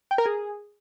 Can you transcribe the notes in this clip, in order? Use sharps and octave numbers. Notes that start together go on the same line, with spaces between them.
G5
A#4
G#4